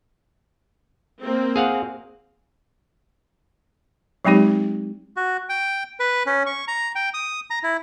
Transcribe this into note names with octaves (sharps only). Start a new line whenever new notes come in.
A#3 C4
G#4 F5 F#5
F#3 G#3 C4 D#4 G4
F#4
G5
B4
C#4
C#6
A#5
G5
D#6
A#5
E4